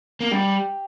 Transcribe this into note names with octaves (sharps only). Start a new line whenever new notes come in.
A#3
G3 G4 G5